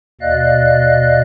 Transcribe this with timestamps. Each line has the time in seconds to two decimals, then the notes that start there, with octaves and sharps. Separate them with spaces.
0.21 D#2 B2 D5 D#5 F5 F#6